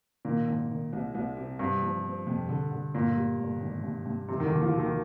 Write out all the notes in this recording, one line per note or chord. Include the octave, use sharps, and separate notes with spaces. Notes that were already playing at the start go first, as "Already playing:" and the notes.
A#2 D#3
G#1
D#3
C2
C2
C3
G2 C3
F3
C4
F2
D3
D3
G1 A#2
G3
G1
G#1
G2
G2
F1 C3
D#3
D3
D#2
F3
D#2
D#3